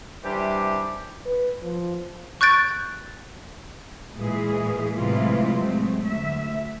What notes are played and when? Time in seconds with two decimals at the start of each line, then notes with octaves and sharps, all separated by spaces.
0.24 C3 E3 G3 D4 G4
1.25 B4
1.62 F3
2.41 C#6 F#6 G6 A6 D7
4.16 A#2 E3 G#3 G#4
4.96 A2 C3 E3 F#3 G#3 F4
5.61 F#3 G#3 A3 C4
6.07 D2 E5